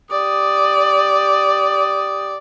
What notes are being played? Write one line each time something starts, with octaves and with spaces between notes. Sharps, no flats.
G4 D5 D#6